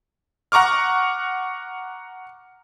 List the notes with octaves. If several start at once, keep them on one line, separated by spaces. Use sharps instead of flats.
F#5 A#5 C#6 D6 F6